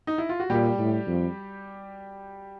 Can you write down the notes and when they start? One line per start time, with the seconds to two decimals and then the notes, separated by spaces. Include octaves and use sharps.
0.07 D#4
0.18 E4
0.29 F4
0.40 F#4
0.50 A#2 G3 G4
0.78 A2
1.07 F2